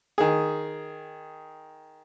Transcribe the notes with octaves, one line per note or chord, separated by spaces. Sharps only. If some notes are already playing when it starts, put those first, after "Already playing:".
D#3 G#4